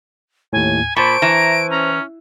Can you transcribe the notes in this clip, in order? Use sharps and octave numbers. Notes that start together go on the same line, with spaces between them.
D#2 A2 G#5
A#2 C5 A5 B5 C#6 D7
E3 A#5
C#4 A#5